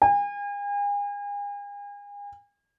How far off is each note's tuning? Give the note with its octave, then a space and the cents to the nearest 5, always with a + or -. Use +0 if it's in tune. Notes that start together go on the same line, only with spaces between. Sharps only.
G#5 -40